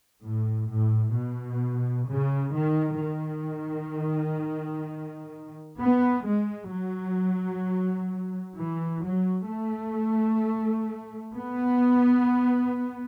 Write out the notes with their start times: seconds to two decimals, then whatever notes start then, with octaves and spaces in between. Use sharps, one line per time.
0.23 A2
0.70 A2
1.16 B2
2.09 C#3
2.55 D#3
3.01 D#3
5.79 B3
6.25 G#3
6.72 F#3
8.57 E3
9.03 F#3
9.49 A3
11.35 B3